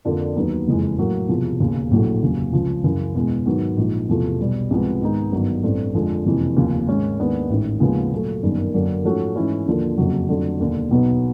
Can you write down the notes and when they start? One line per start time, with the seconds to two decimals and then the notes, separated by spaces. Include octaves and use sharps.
0.05 F2 D3 F3 A#3 D4
0.36 D#2 D#3 F#3 B3 D#4
0.67 F#1 F2 C#3 E3 G#3
0.98 A2 F#3 A#3
1.29 E1 E2 C3 F3
1.60 E1 D#2 C#3
1.91 A#1 A2 F#3 A3
2.22 F1 D#2 C#3 F#3
2.53 C#2 C#3 F3
2.84 F#2 C#3 E3
3.15 E2 B2 G#3
3.46 G#2 D#3 F#3 B3
3.77 A#1 G#2 F3
4.08 E1 E2 C3 F3 A3
4.39 B1 B2 G3
4.70 C2 C3 F3 G#3 B3
5.01 G#2 D#3 G#3 B3 D#4
5.32 G1 G2 D#3 F#3
5.63 A1 G2 E3 A3 C4
5.94 F2 D3 F3 G#3
6.25 F#1 F2 C3 E3
6.56 F1 D#2 C#3 F3
6.87 G#2 D#3 G#3 C#4
7.19 D#2 D#3 G#3 B3 D4
7.50 A1 G#2 D#3
7.80 D#2 C#3 F3 G#3 B3
8.11 A#2 F#3 A3
8.43 G1 F#2 D#3 G3 A#3
8.74 F#2 D3 F#3 A#3 D4
9.05 G#2 F3 A3 C#4 F#4
9.35 G#2 E3 A3 C#4 E4
9.66 D#2 D3 F3 A#3
9.98 F#1 F2 C#3 F#3
10.29 F2 D3 F#3 A3
10.60 E1 D#2 D3
10.91 B1 B2 F#3 B3 D#4